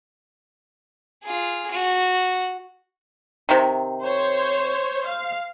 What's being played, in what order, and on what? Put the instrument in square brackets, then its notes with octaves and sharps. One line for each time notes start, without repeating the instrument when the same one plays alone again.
[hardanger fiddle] F4 G#4
F#4
[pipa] C3 D#3
[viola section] C5 C#5
F5